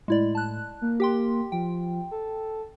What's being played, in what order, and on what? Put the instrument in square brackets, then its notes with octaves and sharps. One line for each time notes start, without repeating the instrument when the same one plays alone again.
[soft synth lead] A2 [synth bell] G#3 E4 D5
[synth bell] A5 F#6
[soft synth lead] A#3
[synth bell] G4 G5 C6
[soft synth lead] F3 [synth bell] G5
[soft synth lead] A4